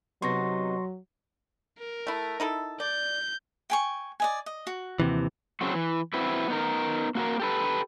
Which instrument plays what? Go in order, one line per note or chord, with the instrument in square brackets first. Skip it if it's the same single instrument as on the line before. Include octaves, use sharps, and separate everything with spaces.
[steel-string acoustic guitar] C3 B3 D#4 [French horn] F#3 [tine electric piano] C6 C#6 A#6
[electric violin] A#4
[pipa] A3 E4
D#4 E4 A4
[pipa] D5 [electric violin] G6
[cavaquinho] G5 G#5 C#6
D5 D#5 G#5
D#5
F#4
[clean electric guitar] D#2 C3 E3
[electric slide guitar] C#3 F#3 C4 F#4
E3
C4 E4 F#4 B4
B3 D#4 A#4
A#3 F#4 A4 A#4
G4 A4 B4